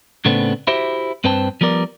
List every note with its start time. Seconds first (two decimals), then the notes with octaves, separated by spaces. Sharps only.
0.25 A2 C#3 A3 B3 C4 D4
0.67 E4 F#4 G4 C5 E5
1.24 G2 C4 B4 C5 G5 A5
1.61 F3 G3 B3 A#4 D5